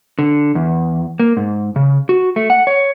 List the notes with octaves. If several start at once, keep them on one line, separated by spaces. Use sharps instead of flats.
D3
E2
A#3
G#2
C#3
F#4
A3
F#5
C#5